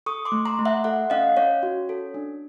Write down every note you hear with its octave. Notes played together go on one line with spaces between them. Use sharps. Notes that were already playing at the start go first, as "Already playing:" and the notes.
A4 C#6 D#6
C6 D6
A3
A#5 C6
A3
E5 F#5
A4 E5 F#5
C#4 D#5 F5
C#4 C#5
F#4
A4
D4